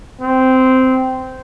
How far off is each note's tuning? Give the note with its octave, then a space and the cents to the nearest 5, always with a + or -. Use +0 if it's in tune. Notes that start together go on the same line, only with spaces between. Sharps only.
C4 -10